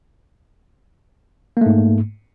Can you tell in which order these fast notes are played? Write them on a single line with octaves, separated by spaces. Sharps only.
A#3 A3 G#2